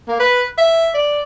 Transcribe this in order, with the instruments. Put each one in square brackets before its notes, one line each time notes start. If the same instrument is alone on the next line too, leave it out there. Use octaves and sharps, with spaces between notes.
[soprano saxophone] A#3
B4
E5
D5